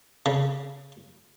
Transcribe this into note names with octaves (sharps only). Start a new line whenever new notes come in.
C#3